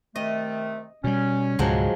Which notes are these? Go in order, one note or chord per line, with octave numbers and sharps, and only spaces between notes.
C3 D#3 A3 D#5
B2 G3 C#4
C#2 G#2 B2 F3 F#3 G#3